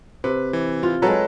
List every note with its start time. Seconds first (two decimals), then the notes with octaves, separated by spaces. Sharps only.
0.24 C3 B4
0.53 E3
0.83 F4
1.02 F#3 G#3 A4 B4 A#5